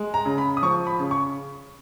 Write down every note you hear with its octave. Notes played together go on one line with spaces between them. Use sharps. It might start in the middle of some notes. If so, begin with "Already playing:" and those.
Already playing: G#3
A#5
C#3
B5
D#6
F3 C#6
B5
C#3
C#6